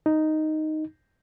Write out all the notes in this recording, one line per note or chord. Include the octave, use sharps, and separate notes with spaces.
D#4